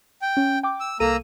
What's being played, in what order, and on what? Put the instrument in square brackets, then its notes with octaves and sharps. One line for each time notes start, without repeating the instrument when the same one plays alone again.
[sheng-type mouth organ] G5
[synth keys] C#4
G5 D6
[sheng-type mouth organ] E6
[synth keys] C2 A4 D#7 [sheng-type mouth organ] A#3 A#5 E6